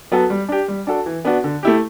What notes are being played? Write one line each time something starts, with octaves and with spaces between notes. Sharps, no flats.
F#3 B3 F#4 A4
G3
D4 G4
G3
D4 F#4 A4
E3
B3 D4 F#4
D3
A3 E4 G4